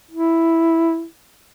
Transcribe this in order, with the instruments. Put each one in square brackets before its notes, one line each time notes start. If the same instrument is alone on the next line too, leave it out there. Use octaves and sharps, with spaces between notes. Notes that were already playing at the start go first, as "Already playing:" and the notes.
[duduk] E4